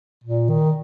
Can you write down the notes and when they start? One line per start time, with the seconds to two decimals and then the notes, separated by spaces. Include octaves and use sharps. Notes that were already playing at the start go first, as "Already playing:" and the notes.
0.24 A#2
0.49 D#3